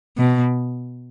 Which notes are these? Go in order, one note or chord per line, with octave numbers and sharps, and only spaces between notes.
B2